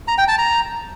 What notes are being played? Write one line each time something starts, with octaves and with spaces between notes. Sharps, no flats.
A#5
G5
A5
A#5